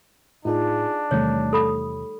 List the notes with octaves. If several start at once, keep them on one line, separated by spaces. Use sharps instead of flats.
A2 D4 D#4 F4 G#4
E2 C3 D#3 G3 A3 C#5
A4 B5 D#6